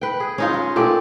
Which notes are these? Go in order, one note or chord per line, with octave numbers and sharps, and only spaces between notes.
B4 G5
G#4
C#4 D#4 F4
G#3
A#2 A3 G4 D5